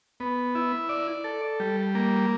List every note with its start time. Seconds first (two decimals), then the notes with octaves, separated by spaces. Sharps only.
0.20 B3
0.55 E4
0.89 D5
1.24 A4
1.60 G3
1.95 A#3